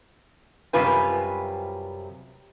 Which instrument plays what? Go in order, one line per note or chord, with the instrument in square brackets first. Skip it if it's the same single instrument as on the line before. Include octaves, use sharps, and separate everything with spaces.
[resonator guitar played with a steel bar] F#2 C3 G3 F4 B4 G#5